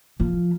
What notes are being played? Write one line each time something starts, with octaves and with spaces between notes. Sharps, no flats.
F3